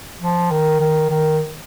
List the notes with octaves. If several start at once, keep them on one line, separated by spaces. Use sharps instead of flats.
F3
D#3
D#3
D#3